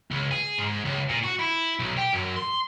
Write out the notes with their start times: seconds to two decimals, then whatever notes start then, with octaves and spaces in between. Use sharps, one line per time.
0.11 C#2
0.31 G#4
0.58 G#2
0.85 C#2
1.09 A#2
1.23 F#4
1.39 E4
1.79 B1
1.97 G4
2.14 F#2
2.37 C6